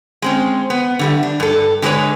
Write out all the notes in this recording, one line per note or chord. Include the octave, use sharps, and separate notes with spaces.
G#3 C4 C#4
B3
D3 G3 A3
D4
G2 A4
D3 G#3 G4 A4 B4 C#5